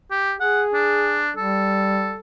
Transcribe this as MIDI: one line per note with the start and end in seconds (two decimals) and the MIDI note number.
0.11 0.34 67
0.40 1.24 68
0.40 0.62 78
0.74 1.32 62
1.37 2.17 55
1.37 2.20 69